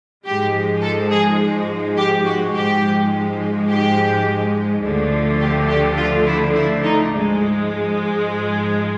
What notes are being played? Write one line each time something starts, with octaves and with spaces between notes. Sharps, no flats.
G#2 F3 G#3 G4
A4
G#4
G4
F#4
G#2 F3 G#3 G4
G4
D2 D3 F3 A3
G4
G4
F4
E4
E4
D#4
G#2 F3 G#3